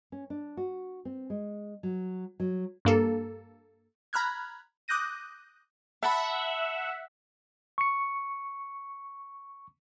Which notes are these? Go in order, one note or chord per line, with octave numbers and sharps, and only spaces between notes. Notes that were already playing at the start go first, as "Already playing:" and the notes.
C#4
D4
F#4
C4
G#3
F#3
F#3
G2 A#3 A4
A#5 B5 F6 F#6 G#6
D6 D#6 F#6 G6 A#6 D#7
E5 F#5 A5 B5
C#6 C#7